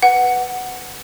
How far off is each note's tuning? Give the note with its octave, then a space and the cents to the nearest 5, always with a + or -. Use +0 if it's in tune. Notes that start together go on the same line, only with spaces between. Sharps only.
B4 +0 F#5 +0